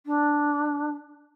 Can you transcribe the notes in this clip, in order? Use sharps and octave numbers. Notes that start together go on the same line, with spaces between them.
D4